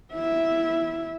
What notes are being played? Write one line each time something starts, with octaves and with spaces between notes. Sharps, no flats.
E4 E5